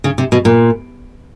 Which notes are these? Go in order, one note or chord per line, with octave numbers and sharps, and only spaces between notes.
C#3
C3
B2
A#2